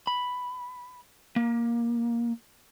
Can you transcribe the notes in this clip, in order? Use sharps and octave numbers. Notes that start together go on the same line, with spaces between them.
B5
A#3